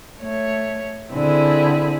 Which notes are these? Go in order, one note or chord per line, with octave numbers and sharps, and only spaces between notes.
A3 C#5
D3 C4 E4 G#4